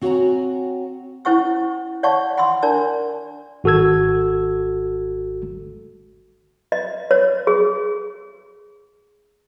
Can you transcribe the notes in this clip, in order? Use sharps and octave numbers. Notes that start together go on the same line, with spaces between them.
C4 F#4 C#5 F#5 G#5 A#5
C#4 E4 C5 F#5 C#6 E6
C#5 D5 F5 F#5 A5 C#6
F#5 B5 C6 E6
D4 A#4 D5 A5 E6
G#1 F#4 A4 E6 G#6
D#5
C#5
G#4